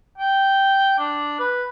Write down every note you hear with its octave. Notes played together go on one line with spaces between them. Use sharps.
G5
D4
B4